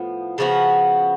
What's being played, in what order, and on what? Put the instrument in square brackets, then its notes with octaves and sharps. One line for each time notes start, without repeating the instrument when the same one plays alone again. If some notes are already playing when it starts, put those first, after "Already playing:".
Already playing: [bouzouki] A2 F3 B3
C#3 F3 B3 F#4